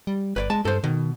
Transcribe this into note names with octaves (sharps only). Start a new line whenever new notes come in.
G3
G1 B4 C#5 D5
G#3 A5
G2 A4 C5
B2 D#3